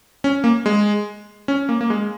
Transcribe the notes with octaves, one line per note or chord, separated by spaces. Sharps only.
C#4
A#3
G#3
C#4
A#3
A#3
G#3